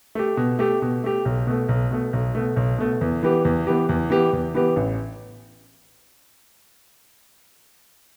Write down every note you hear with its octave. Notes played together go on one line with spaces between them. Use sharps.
A3 G4
B2
A3 G4
B2
A3 G4
B1
B2 A3
B1
B2 A3
B1
B2 A3
B1
B2 A3
E2
E3 B3 G4
E2
E3 B3 G4
E2
E3 B3 G4
E2
E3 B3 G4
A1